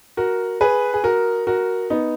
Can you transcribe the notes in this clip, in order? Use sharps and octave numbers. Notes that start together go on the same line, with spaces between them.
F#4 A#4
G#4 B4
G#4
F#4 A#4
F#4 A#4
B3 D#4